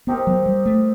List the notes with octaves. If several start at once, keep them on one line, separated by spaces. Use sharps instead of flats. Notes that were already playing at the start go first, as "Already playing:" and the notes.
B3 C4 D#4 G4 A#4
F#3
G3
A3